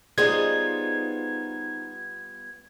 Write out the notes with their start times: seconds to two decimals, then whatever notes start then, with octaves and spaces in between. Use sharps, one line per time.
0.18 G3 B3 D#4 F4 G#4 C5 G#6